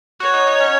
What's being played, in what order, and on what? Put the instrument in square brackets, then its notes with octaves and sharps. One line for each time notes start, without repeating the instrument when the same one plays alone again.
[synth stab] F#4 [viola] C#5
[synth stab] D#4
D#4
C#4